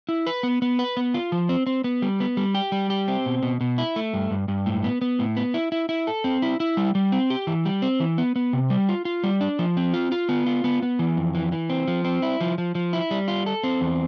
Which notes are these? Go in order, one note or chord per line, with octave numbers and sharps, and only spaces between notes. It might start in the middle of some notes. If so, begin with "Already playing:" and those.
E4
B4
B3
B3
B4
B3
F4
F3
C4
C4
B3
G3
B3
G3
G4
G3
G4
C4
B2
B2
B2
E4
A3
G2
G2
G2
A2
B3
B3
A2
B3
E4
E4
E4
A4
C4
E4
E4
G3
G3
C4
G4
E3
G3
C4
E3
B3
B3
C3
G3
F4
F4
G3
D4
F3
C4
F4
F4
B3
F4
B3
B3
E3
F2
E3
E3
C4
F3
C4
E4
F3
F3
F3
E4
G3
F4
A4
C4
E2